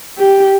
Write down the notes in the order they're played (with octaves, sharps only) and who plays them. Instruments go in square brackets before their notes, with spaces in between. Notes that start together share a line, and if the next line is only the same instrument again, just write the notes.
[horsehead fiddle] G4